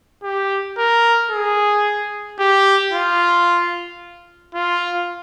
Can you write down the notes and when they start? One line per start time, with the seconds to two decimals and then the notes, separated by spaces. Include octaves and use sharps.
0.23 G4
0.78 A#4
1.31 G#4
2.39 G4
2.93 F4
4.55 F4